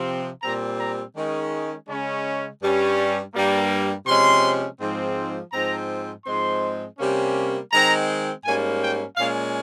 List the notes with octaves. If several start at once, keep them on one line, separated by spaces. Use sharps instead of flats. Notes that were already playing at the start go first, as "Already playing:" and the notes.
Already playing: C3 F3 C4
A#2 G3 C4 A#5
A#5
D#3 G#3 C#4
C#3 G#3 C#4
G2 G3 C#4
G2 G3 A#3
C3 F3 G#3 C#4 C6
G#2 F3 C4
G#2 F3 C4 A#5
G#2 F3 G#3 C4 C6
C3 G3 A#3 C#4
D#3 G#3 C4 A#5
G#2 G3 A#3 C#4 G#5
G5
A#2 G#3 C#4 F5